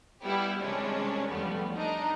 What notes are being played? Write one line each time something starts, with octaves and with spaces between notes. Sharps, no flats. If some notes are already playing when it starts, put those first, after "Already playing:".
G3 B3 E4 G4
C3 D#3 G3 G#3 C#4 D4
E2 F3 G3 A3 B3
D4 D#4 D#5 A#5